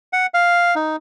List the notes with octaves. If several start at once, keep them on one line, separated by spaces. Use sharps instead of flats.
F#5
F5
D#4